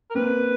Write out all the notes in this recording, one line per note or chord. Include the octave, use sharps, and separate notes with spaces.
A#4
A#3 C4 B4